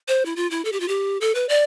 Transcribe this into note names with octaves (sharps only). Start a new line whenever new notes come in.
C5
E4
F4
E4
A4
G4
F4
G4
A4
B4
D5